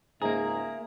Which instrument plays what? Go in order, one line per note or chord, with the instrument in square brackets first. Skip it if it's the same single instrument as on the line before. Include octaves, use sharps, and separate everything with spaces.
[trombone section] C#2 G#2 [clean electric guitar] A#3 G#4 [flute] E5 [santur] A#5